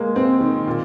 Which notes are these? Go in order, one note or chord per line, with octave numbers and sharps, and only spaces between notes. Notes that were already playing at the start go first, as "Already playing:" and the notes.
Already playing: G#3 A#3
C4
D#3
A#2